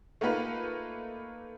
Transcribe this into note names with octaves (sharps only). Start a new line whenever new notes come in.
A3 A#3 D#4 F4 B4